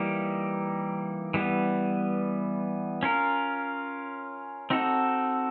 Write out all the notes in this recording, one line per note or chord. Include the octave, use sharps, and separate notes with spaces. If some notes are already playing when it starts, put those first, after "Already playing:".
Already playing: E3 G3 A#3 D#4 G4
E3 G3 B3
C#4 F4 A#4
C4 D#4 F#4 A4